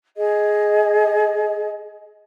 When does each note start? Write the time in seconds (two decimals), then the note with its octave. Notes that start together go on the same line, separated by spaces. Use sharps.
0.17 G#4 D#5